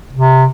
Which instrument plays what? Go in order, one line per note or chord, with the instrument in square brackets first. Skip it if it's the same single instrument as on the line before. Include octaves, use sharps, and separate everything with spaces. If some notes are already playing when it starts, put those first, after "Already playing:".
[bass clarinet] C3